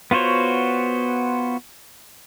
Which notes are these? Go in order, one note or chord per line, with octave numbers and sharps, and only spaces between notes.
B3 F4 F#4 C5 C#5